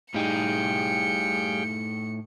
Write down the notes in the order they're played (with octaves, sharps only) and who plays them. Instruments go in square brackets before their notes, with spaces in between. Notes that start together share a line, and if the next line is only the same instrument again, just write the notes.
[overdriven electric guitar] A2 D#4 [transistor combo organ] G3 G#4 F5 [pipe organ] G5 [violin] C#7